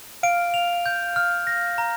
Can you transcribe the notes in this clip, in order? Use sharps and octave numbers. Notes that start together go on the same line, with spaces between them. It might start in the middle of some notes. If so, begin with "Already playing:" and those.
F5 D7
F7
G6
F6
A#6
A#5